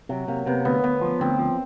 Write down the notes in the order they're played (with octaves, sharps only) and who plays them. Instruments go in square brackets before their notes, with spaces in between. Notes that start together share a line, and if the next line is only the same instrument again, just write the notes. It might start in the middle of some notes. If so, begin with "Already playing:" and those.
[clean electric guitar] C3 [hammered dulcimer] F#3
[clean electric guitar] C3 [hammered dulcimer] A#3
[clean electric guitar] C3 [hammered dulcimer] B3
[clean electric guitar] D2 [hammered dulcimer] B3
[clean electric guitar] D2 [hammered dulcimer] B3
[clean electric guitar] F3
[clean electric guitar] D2 [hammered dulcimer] C4
[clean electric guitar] F3